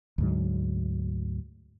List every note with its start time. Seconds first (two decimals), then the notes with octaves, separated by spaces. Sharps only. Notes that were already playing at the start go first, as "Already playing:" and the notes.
0.18 D2 G#2 F#3